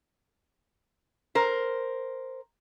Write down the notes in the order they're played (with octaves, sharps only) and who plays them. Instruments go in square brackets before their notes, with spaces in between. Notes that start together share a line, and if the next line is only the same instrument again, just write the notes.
[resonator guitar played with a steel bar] A#4 C5